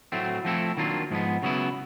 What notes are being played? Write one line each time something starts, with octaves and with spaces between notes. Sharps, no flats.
A2 F#3 A3 C4
F3 A3 C4 E4 A4
D#3 F#3 A#3 D4 F4
G#2 F3 G#3 B3
C#3 F#3 B3 E4